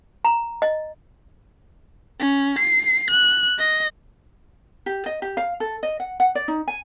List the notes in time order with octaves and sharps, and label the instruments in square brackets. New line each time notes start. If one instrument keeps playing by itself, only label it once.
[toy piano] A#5
D#5
[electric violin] C#4
C7
F#6
D#5
[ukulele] G4
D#5
G4
F5
A4
D#5
F#5
F#5
D5
D#4
G#5